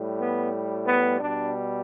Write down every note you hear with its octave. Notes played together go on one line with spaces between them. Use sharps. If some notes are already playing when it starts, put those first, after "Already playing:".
Already playing: A2 G3
B3
B3
B2 G3 D4